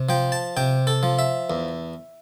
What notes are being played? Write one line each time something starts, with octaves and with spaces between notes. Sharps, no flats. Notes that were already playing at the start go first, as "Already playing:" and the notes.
Already playing: C3
F3 G5
A5
C3 G5
A4
F3
E5
E2